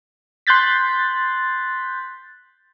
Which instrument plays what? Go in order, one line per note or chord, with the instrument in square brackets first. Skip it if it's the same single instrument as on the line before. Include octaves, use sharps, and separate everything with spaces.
[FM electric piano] C6 F#6 G6 A6 B6